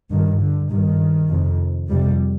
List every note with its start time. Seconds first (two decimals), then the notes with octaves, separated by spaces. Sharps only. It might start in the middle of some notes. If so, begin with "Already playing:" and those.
0.11 G2 D#3
0.41 D3
0.70 G2 D#3
1.30 F2 C3
1.89 F2 C3 G3